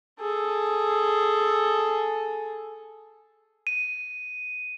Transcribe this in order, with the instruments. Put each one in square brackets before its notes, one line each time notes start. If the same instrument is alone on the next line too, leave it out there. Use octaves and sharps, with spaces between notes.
[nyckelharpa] G#4 A4
[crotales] D#7